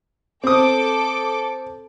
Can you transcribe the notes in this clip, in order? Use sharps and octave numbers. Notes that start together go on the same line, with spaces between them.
C4 A4 D6 D#6